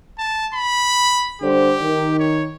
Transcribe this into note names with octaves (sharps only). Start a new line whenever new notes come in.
A5
B5
D3 G3 G4 C5
D#3
C#5